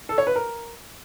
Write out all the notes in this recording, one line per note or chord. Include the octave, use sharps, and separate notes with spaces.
A4
C#5
B4
A#4